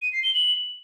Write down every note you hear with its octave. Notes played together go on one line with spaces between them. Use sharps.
D#7
C7
G7
F#7